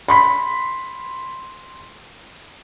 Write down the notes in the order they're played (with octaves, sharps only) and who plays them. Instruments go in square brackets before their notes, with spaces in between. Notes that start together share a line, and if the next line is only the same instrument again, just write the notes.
[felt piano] B5 C6 B6